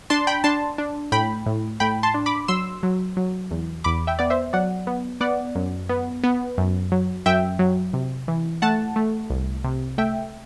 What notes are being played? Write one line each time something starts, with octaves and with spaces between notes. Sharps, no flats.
D4 A5 C6
G5 B5
D4 A5 C6
D4
A2 G5 B5
A2
A2 G5 B5
A5 C6
D4
B5 D6
F#3 C6 E6
F#3
F#3
E2
E2 B5 D6
E5 G5
B3 D5
C5 E5
F#3 D5 F#5
B3
B3 D5 F#5
F#2
B3
B3
F#2
F#3
F#2 E5 G5
F#3
C3
E3
A3 F#5 A5
A3
C2
C3
A3 E5 G5